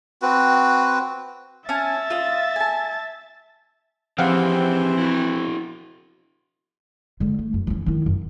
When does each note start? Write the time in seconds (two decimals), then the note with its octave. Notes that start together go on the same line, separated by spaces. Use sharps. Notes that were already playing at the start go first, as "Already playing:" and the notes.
0.22 C4 F#4 B4
1.69 C#4 E5 G#5 A5 A6
2.10 F4 D#5
2.56 G#5 A5
4.19 E3 F3 C4 G4 G#4 C5 F5 F#5
4.98 E4 F#4
7.20 D3 G#3
7.39 A3
7.54 F#2
7.67 E3 C#4
7.86 D#3 E4
8.06 F#2